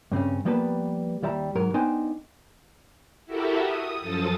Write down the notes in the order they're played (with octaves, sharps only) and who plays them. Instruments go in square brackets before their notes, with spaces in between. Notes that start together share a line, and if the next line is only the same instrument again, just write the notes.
[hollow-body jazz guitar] G2 C#3 C4 C#4
F3 G3 A#3 B3 B4 A5
D#2 G3 E5 A5 A#5
G#2 F#3 A#4
B3 D4 D#4 C5 G5 G#5
[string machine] E4 F#4 G4 A4 A#4 E5
D#6
F#2 F3 A4 D#6 A6